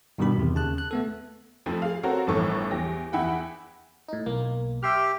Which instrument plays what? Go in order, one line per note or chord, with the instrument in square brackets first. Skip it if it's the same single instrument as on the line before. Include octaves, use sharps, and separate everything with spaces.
[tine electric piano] G2 B2 D#3 G3 G4 B5
E2 C3 D#3
D#2 C#3 A5 F#6
F#6
A3 B3 A4
[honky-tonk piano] F2 F3 A3 C4
G#4 F5
C4 F#4 A4 A#4 C#5
G1 F2 A2 E3 A4 C#6
E2 G4 A#6
E2 E4 F#5 G5 B5
[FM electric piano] A2 D#4
B1 A#3
[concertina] G4 [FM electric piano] E5 C6 F6